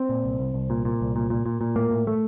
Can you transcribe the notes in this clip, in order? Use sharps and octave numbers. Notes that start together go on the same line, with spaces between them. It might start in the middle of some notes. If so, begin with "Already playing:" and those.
Already playing: C4
A#2
C2
C2
C2
A#2
A#2
C2
A#2
A#2
A#2
A#2
A2 A#3
A2
A3